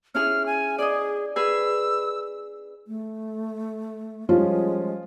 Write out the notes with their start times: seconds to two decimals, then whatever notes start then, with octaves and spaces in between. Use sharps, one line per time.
0.15 C#4 E4 G#4 F6
0.46 G#5
0.79 G#4 D5 D#5
1.36 G#4 B4 G#5 E6
2.87 A3
4.29 F3 G3 G#3 C#4 F4